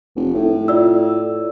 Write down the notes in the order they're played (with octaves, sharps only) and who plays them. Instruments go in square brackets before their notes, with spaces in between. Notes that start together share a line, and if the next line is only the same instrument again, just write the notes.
[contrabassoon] F1
A2
[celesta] F4 D5 E6